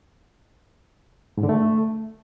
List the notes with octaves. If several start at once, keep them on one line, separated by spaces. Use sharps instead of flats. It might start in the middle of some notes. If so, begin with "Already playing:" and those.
G#2
D3
A3